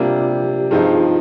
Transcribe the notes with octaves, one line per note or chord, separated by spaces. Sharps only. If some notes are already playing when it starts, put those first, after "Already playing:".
Already playing: C3 G3 A#3 D4 F4
G4
G2 F3 C4 D#4 G#4